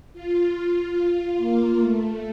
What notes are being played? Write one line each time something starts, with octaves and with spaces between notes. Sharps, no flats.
F4
A#3
A3